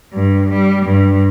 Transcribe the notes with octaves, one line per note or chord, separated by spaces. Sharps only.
G2
G3
G2